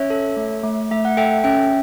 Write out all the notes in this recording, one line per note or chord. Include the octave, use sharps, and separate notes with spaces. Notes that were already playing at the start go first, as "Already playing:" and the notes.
Already playing: C#4 C#5 E5
A4
A3
A3
A3 E5
F#5
A4 E5 G5
C#4 E5 G5